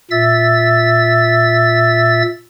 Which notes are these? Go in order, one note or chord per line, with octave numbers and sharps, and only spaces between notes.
A#2 E5 E6 A6